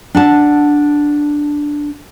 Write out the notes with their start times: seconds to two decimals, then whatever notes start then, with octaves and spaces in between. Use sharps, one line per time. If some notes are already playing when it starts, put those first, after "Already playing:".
0.15 D4 F#5 A5